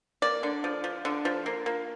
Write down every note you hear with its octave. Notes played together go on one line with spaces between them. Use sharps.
A#3 D5
D3
F3
F3
D3
F3
A#3
A#3